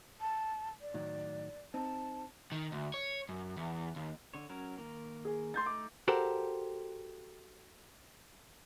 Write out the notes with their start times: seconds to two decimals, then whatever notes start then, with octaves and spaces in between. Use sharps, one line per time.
0.21 A5
0.81 D5
0.94 A2 D#3 F#3
1.74 C4 D#4 A5
2.52 D#3
2.72 D2
2.94 C#5
3.29 F#2
3.57 E2
3.96 D#2
4.34 D3 C#5
4.49 F#3 C#4 A#4
4.78 D#3 A#3 A#4
5.25 G#4
5.54 A3 D#4 C6 G6 A6
5.66 D6
6.08 F#4 G4 A4 A#4 C5